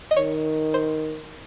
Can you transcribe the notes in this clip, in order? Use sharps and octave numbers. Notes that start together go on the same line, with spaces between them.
D#5
D#3 C#5
C5